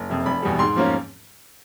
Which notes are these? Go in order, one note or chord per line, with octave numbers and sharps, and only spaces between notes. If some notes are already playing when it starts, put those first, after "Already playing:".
Already playing: F#1
F2 C3
F1 B5
E2 B2 G3
G#2 C6
F3 A#3 C#4